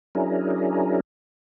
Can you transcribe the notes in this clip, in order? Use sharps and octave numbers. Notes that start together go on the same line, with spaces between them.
F#3 C#4 D4 E4 G#4 A#4